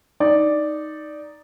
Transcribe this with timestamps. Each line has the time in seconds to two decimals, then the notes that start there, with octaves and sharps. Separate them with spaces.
0.20 D#4 D5